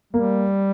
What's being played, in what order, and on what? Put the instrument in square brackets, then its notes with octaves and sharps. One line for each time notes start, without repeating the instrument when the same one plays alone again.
[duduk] G3 [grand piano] A#3